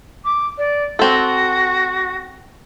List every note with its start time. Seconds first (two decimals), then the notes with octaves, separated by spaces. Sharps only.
0.24 D6
0.57 D5
0.99 C4 F#4 A4